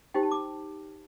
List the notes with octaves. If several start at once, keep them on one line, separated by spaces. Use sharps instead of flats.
D#4 G4 C5 G5
A5
D6